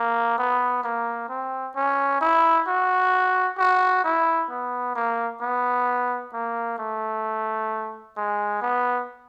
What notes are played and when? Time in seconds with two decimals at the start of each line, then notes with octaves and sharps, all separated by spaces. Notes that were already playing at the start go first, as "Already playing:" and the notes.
Already playing: A#3
0.38 B3
0.84 A#3
1.29 C4
1.76 C#4
2.21 E4
2.67 F#4
3.59 F#4
4.04 E4
4.50 B3
4.96 A#3
5.41 B3
6.34 A#3
6.79 A3
8.17 G#3
8.62 B3